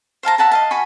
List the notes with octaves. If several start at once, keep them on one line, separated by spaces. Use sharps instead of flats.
C5 F5 A5 A#5
E5 F#5 A5 A#5
D#5 F5 A5
F#4 G#5 B5 C#6